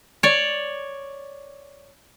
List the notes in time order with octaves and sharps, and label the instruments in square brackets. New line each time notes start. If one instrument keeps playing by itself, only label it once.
[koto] C#5 D5